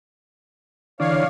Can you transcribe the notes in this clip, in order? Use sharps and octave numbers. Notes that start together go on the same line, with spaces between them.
D3 E3 C#5 D5 F5